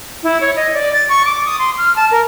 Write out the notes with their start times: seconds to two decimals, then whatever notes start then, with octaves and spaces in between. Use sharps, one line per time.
0.23 E4
0.41 C#5
0.56 D#5
0.74 D5
0.93 A6
1.09 C#6
1.25 D6
1.46 D#6
1.59 C6
1.78 F6
1.96 A5
2.11 A#4